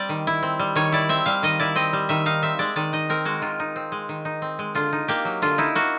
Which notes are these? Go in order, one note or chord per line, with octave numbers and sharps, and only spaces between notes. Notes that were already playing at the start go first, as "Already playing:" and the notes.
Already playing: G3 C4 D5
D#3
E4
C4
G3
D#3 C#5
E4 D5
C4 E5
G3 F5
D#3 D#5
E4 D5
C4 D#5
G3
D#3 E5
D#4 F5
C4 E5
G#3 D5
D#3 D5
D#4 D#5
C4 A#4
G#3 F#4
D#3 F4
D#4
C4
G#3
D#3
D#4
C4
G#3
D3 F4
D#4
A#3 G4
F#3
D3 F4
D#4 E4
A#3 F#4